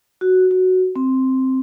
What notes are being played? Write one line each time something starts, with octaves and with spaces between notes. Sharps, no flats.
F#4
F#4
C4